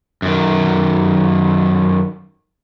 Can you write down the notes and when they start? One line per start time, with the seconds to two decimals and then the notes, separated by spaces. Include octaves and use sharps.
0.22 F#2 D#3